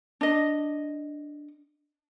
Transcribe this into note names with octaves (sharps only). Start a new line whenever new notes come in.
D4 D#5